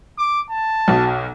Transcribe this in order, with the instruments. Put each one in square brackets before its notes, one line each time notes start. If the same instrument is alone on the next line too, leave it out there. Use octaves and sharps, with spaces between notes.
[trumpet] D6
A5
[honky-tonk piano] B1 B2